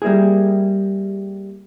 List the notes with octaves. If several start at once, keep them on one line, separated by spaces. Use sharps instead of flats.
G3 A#3 E4 G#4